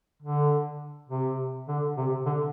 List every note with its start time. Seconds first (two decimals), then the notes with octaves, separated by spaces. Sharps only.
0.22 D3
1.09 C3
1.68 D3
1.97 C3
2.26 D3